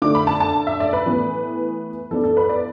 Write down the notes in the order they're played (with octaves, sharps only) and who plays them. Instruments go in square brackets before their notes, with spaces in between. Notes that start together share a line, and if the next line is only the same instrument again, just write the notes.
[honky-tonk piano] D3 A3 D4 D6
B5
A5
A5
E5
D5
B4
A2 E3 B3
E3 B3 D4 A4
A4
B4
D5